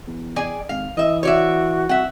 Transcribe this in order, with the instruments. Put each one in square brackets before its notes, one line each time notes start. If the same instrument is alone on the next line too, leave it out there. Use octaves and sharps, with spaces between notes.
[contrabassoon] E2
[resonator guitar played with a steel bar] G#4 D5 G#5
[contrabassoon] G#1 [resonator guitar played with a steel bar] F5
[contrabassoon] E3 [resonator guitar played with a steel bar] D#5 E5
[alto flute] F#4 [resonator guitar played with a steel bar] C#5 D5 E5
[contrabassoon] C2 [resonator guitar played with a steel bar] E5 F#5